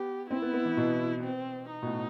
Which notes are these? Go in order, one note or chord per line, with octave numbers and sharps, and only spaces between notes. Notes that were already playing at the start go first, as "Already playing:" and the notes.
Already playing: B3 G4
C4 E4
B3
B3
E3
B2
C4
D#4
B2
A2